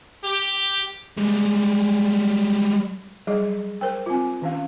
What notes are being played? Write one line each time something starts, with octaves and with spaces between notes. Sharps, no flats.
G4
G3 G#3
F#3 G3 G#4 D#5
A#4 C5 G5
C4 F4
D#3 C#4 F5